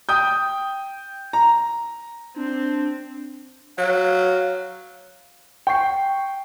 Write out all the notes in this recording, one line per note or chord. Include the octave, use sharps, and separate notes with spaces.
G5 D#6 G6
A#5
C4 D4
F#3 F5
G5 C#6 C7